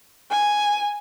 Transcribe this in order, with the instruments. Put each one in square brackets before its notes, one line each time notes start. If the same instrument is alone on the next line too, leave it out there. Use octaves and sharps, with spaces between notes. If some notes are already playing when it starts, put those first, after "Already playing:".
[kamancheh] G#5